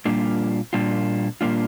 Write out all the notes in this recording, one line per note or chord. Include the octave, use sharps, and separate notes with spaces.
A#2 G3 A#3 D4 F4
A#2 G3 A#3 D4 F4
A#2 G3 A#3 D4 F4